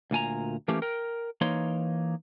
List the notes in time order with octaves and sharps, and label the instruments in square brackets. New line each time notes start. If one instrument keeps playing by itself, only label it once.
[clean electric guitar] D2 A#2 G#5 A#5
E3 A3 A#3 C#4 G4
A#4 G5
E3 A#3 D#4 C#5 C6